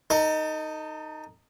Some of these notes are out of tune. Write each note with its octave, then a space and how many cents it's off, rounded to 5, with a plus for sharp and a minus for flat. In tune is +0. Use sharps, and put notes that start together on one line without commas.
D#4 +0 A4 +35